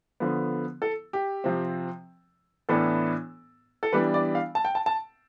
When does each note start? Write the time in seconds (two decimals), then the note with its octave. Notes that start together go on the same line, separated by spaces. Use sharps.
0.20 D3 F3 B3
0.82 A4
1.13 G4
1.44 C3 F3 C4
2.69 A2 E3 B3 D4 A4
3.83 A4
3.93 E3 G3 B3 D4 B4
4.14 D5
4.35 F5
4.55 A5
4.65 G5
4.75 A5
4.86 A5